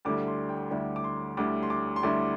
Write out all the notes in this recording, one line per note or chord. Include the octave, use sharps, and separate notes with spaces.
D2 D3 G3 E4 D6
C6
G5
D2 D3 G3 E4
D6
C6
D2 D3 G3 E4 D6
C6
D6
C6
D2 D3 G3 E4 D6